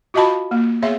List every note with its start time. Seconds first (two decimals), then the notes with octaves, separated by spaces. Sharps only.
0.14 F4 F#4 D#5 F5 A5 B5
0.51 A#3
0.82 B3 G#4 C#5 E5 F5 C6